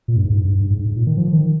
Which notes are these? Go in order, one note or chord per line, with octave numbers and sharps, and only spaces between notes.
A#2
G2
G#2
G2
G2
G2
G#2
G#2
A#2
D#3
F3
D#3